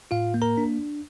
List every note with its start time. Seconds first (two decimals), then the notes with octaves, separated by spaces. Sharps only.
0.11 A2 F4 F5
0.34 A#3
0.42 A#4 A#5
0.57 D4